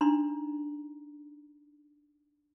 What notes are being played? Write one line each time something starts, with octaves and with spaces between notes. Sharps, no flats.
D4 D#4 A#5 C6